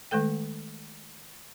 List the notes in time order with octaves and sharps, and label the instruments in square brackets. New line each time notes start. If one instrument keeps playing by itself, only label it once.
[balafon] D#3 G#3 A3 A4 G5